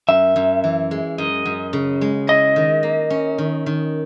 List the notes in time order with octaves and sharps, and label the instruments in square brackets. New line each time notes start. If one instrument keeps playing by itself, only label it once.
[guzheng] F#2 [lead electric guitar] E5
[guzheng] F#2
E3
G#3
[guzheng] F#2 [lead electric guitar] D#5
[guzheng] F#2
C#3
G#3
[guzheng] E4 [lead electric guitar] D#5
[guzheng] D#3
A#3
C#4
D#3
D#3